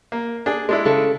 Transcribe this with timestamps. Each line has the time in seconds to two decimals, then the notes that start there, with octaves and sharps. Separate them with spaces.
0.12 A#3
0.46 D4 G#4
0.69 G#3 D4 E4
0.85 C#3 A4